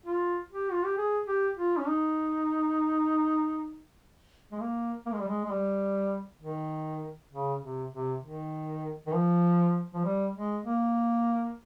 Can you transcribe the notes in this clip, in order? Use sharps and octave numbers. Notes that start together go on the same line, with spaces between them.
F4
G4
F4
G4
G#4
G4
F4
C#4
D#4
G#3
A#3
A#3
G#3
G3
G#3
G#3
G3
D#3
C#3
C3
C3
D#3
D#3
F3
F3
G3
G#3
A#3